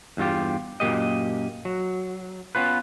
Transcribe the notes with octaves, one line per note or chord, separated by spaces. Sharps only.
E2 G2 G#3 F4 G4
F#2 A#2 F3 A#3 G4 D#5
F#3
B3 C#4 F4 B4